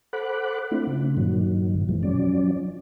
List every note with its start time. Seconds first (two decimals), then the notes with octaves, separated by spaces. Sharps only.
0.13 A4 C5 F#5 B5 D6 F#6
0.71 A3 C4 D4 E4 F4
0.87 C#3
1.17 G2 A#2 D#3 F#3
1.89 F#2 B2 E3 F3 G#3
2.03 F3 F#3 C#4 D5